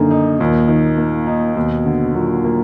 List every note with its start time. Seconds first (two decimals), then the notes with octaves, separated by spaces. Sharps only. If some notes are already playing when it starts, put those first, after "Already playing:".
Already playing: F#2 D3 D#3 A#3
0.11 D#4
0.40 D#2 A#2
0.68 D#3
0.97 A#3
1.27 D#4
1.56 D#2 B2
1.86 D3
2.14 A#2 F#3
2.44 A#3